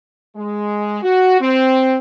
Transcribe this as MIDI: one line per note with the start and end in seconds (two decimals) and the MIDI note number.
0.36 0.99 56
1.03 1.40 66
1.41 1.98 60